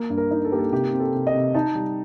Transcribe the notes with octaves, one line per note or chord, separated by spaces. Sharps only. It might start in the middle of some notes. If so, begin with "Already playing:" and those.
Already playing: A#3
G2
A#4
D#4
A4
A#3 G4
A4
C3 G4
C4
A4
C3
D#5
C3
D#4 A5
G3